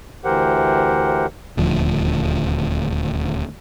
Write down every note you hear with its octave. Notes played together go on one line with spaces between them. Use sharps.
D2 E3 G4 A#4 C5 F#5
D#1 D2 F3